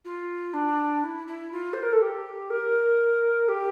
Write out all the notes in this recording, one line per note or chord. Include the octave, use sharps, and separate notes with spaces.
F4
D4
E4
E4
F4
C5
A#4
A4
G4
A#4
G4